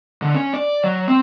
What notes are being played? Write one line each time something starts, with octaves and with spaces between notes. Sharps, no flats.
D3
C#4
D5
F#3
C4